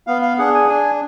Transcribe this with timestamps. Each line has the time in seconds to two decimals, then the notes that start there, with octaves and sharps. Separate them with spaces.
0.07 B3 F5
0.22 F5
0.38 D4 G#4 F#5
0.54 G#5
0.69 D4 G#5